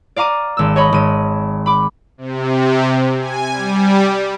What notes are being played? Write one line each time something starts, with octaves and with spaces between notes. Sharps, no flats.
D5 F5 A#5 D6 D#7
G#1 E6
C#5 D#5 B5
G#1 D#7
B5 D6
C3
G#5
G3